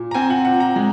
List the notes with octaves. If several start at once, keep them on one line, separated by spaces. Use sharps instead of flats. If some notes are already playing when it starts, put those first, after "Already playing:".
Already playing: A#2
A#5
C4 G#5
F#5
A#2 F#5
A#5
G#3